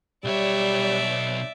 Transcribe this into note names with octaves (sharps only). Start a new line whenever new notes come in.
B1 G3 C#5 D5 E5